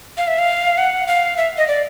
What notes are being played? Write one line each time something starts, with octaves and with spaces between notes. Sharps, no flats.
F5
E5
F5
F#5
F5
E5
D#5
D5